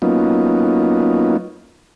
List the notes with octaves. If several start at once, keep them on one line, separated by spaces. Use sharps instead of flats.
F#3 A#3 B3 C#4 D#4 F4